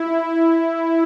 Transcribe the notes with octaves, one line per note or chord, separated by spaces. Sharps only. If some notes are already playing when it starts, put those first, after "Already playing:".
Already playing: E4